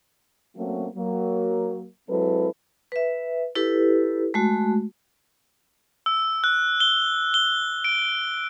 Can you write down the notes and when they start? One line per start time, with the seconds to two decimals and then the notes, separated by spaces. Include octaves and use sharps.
0.57 F#3 A3 A#3 C4 C#4 F#4
0.95 F#3 A#3
2.09 F#3 G#3 C4 E4 A4 B4
2.92 B4 E5
3.55 E4 G4 A4 B4
4.34 G#3 A3 F#4
6.06 E6
6.44 F#6
6.80 G7
7.34 G7
7.84 D7